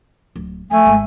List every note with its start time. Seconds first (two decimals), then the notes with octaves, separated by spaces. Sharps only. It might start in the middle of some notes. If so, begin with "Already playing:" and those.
0.36 D1
0.71 F3 A3 G#5
0.86 G#1